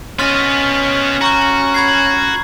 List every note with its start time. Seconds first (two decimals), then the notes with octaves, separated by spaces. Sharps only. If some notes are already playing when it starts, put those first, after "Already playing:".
0.19 B3 C#4 D#5 C6 F6 A6
1.21 F#4 A#5 C#6 G6
1.74 B5 G#6 C7